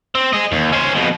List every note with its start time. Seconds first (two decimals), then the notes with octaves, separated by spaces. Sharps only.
0.15 C4
0.33 G#4 D#5
0.52 D#2
0.72 C#4 C5
0.95 F2 B2